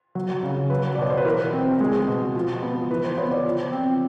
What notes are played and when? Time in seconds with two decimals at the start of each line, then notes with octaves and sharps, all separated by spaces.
0.15 F#3
0.43 C#3
0.70 F#3 B4
0.95 D5
0.98 B2 C#5
1.10 C5
1.17 B4
1.25 E3 A#4
1.52 C4
1.80 G#3
2.08 B2
2.35 F3
2.62 B3
2.90 E3 B4
3.04 C5
3.17 B3 C#5
3.31 D5
3.45 F3
3.72 C4